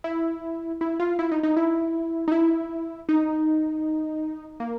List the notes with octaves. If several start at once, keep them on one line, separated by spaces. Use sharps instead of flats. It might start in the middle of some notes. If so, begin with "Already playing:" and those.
E4
E4
F4
E4
D#4
D#4
E4
D#4
E4
D#4
A#3